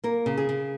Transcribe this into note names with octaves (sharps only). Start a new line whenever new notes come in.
A#3 A#4
C#3
G#4
C#3